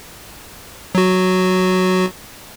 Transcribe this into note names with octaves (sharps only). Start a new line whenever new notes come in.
F#3 F#4